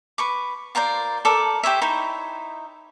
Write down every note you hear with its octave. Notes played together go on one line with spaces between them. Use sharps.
B4 C#6 D6
F4 A#4 C5 D5
A4 A#4 D5 D6
G4 C5 C#5 E5
D#4 E4 C5 C#5